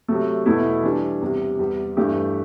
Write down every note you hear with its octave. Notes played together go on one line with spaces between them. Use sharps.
C3 F#3 A3
E2 B2 A3 E4
E3 G3 D4
E2 C3 G3
E2 C3 G3
G2 E3 A3 D4 G4